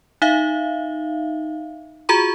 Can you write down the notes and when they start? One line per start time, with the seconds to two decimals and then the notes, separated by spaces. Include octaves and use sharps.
0.22 D#4 E5 F5
2.09 F4 F#4 G#4 A#5 C#6